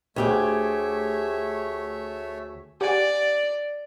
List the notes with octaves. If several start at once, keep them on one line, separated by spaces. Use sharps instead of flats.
D2 A3 G4 G#4 C#5 E5
G4 D5 F#5 G#5